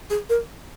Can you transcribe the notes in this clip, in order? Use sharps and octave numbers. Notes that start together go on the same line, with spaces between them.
G#4
A#4